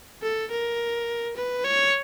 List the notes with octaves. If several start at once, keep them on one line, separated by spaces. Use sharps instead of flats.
A4
A#4
B4
C#5